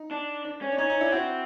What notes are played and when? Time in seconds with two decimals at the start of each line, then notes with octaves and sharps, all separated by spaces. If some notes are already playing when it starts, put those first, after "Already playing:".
Already playing: D#4
0.11 D4
0.45 D4
0.62 C#4
0.72 D4
0.78 C#4 D#4
0.90 D#4
1.01 D4 E4
1.12 C4 E4 F#4